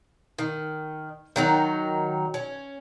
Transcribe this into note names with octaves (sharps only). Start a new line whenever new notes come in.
D#3
D#3 F#3 D#4
C#4